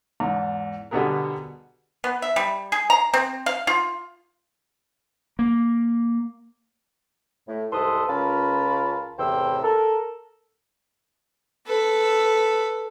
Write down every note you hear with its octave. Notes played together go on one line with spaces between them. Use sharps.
E2 G#2
B2 D3 G3 B3 G#4 A#4
B3
E5
G3
G#4
A#5
C4
F5
F4
A#3
A2
C2 G#2 A4 B4 C6 D#6
C#2 C#4 F4 A#4 A5 B5
E2 A2 C3 C5 G5 E6
A4 A#4
A4 B4